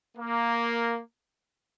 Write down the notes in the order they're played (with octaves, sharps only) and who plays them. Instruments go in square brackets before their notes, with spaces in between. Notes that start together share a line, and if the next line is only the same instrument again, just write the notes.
[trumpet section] A#3